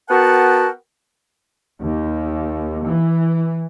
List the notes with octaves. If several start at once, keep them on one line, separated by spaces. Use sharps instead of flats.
B3 F#4 A#4 F#5 G5 A5
D#2
E3